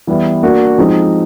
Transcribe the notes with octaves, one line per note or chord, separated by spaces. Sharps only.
E3 G3 B3 E4
A#3 D4 F#4
F3 G#3 C4 D#4